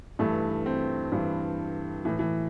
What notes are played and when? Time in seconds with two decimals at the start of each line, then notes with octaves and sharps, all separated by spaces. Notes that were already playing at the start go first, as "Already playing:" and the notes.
0.19 G2 E3 A3
0.66 C4
1.12 G2 E3
2.05 A2 E3
2.19 E3